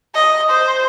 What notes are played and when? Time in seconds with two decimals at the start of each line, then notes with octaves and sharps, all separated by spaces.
0.15 D#5
0.50 C5